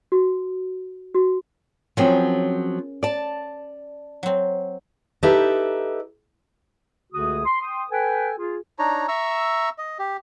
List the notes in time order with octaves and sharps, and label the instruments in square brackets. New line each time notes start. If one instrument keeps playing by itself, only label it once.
[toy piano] F#4
F#4
[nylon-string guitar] F3 F#3 C4 [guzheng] C#4 G#4 A#4
[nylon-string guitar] D5 A5
[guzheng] F#3 C4
[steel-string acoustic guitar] D#4 G4 A4 B4 E5
[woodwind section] C#2 D3 A3 F#4 G#4 D#6
C6
G5 C6 D#6
A4 B4 G5 G#5
F4 G#4
[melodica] D4 D#4 C#5 A#5
E5 A#5 C#6 E6
D#5
G4